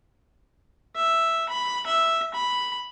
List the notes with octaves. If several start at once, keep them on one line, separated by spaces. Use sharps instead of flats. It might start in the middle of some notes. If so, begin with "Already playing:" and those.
E5
B5
E5
B5